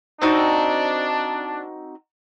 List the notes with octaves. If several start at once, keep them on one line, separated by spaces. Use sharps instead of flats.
C4 D4 D#4 F#4